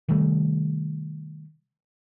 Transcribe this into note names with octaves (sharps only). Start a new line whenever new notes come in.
C3 D#3 G3 A3